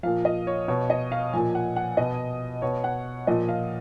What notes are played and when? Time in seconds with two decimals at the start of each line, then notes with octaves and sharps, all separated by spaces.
0.03 A#2 F3 F5
0.25 D#5
0.47 C#5
0.68 B2 C#5
0.90 D#5
1.12 F5
1.33 A#2 F3 G#5
1.55 F#5
1.76 F#5
1.97 B2 D#5
2.62 B2 C#5
2.84 F#5
3.27 A#2 F3 D#5
3.49 F5